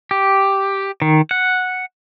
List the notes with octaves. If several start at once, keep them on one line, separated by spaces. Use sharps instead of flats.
G4
D#3
F#5